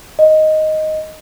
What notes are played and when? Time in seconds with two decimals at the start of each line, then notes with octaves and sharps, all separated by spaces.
0.19 D#5